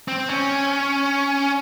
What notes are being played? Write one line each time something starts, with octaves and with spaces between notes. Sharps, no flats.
C4
C#4